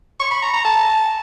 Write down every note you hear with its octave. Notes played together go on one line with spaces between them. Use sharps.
C#6
B5
A#5
A#5
A5